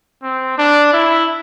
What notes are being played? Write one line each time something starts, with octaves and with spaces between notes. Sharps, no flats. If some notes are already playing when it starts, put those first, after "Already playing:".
C4
D4
E4